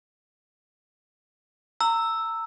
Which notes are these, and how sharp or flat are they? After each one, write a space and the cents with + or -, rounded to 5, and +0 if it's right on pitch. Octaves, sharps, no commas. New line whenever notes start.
A#5 -30 E6 +0